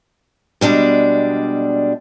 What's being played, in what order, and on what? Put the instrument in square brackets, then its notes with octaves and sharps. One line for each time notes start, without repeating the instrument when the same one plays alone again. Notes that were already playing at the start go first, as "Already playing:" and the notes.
[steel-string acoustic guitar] B2 G3 G#3 D4